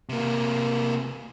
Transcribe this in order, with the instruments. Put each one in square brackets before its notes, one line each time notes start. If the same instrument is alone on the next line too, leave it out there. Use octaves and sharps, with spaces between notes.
[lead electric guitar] C3 A#3